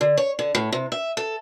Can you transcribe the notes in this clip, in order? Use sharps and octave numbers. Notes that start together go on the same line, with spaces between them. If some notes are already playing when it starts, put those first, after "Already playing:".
D3
C#5
D3
A2
C3
E5
A4